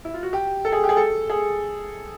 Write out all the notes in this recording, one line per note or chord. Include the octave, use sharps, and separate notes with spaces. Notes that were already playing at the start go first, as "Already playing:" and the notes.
E4
F4
F#4
G4
A4
G#4
G4
G#4
A4
G#4